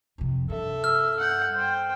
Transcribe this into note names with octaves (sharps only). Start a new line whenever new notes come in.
F2 C3
G2 A4 E5
E6 F6
F#5 G6
C5 G5